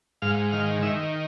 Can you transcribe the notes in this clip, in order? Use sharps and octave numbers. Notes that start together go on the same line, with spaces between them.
G#2 F5
D#3 F5
D#3 E5